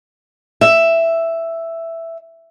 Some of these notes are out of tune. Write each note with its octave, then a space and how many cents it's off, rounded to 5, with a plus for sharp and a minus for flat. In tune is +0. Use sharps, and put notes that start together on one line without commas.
E5 +5